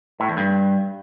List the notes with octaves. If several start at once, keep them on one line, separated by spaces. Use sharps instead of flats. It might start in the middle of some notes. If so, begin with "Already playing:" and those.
A2
E2
G2